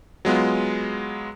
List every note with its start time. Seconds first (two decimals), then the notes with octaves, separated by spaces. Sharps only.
0.25 F#3 G#3 B3 F4